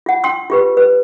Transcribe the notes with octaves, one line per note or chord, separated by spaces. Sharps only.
F4 F#5
G5 C6 E6
F4 G4 B4
B4